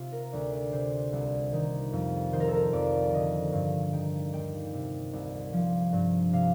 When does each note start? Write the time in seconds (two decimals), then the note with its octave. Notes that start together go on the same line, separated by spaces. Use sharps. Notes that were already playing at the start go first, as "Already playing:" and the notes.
Already playing: C3 F4
0.12 A#4
0.32 D2 D5
0.53 D5
0.73 C3 C5
1.13 C2
1.53 D#3
1.93 F2
2.33 D#3 C5
2.40 A#4
2.48 A4
2.55 A#4
2.73 F2 D5
3.13 D3 D#5
3.53 G2 F5
3.92 D#3 G5
4.33 D#2 G5
4.74 C3
5.13 C2
5.53 F3
5.93 G2
6.33 C3 F5